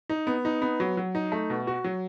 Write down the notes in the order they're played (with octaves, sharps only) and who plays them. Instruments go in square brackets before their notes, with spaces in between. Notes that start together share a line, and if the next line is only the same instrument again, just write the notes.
[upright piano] D#4
B3
D#4
B3
F#3
F#3
D#4
A3
B2
F#4
F#3